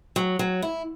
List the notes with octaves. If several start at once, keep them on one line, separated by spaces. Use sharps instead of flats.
F#3
F#3
E4